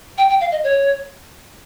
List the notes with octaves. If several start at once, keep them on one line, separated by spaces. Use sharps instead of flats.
G5
G5
F5
D#5
C#5